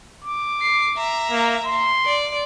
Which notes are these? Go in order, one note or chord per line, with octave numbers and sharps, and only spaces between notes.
D6
C7
E5 A#5
A#3
C6
D5